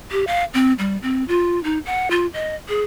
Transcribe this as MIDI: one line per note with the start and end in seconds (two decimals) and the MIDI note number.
0.12 0.25 67
0.27 0.44 77
0.54 0.73 60
0.79 0.97 55
1.03 1.24 60
1.28 1.62 65
1.64 1.79 63
1.86 2.09 78
2.11 2.27 65
2.34 2.55 75
2.69 2.83 68